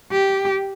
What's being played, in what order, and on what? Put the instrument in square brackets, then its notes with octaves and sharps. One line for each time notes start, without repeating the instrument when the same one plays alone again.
[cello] G4